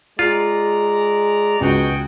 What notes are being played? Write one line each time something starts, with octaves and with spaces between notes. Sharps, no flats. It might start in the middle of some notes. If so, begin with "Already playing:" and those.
G#3 F4 D5 A#5
C#2 B2 F#4 G#4 G5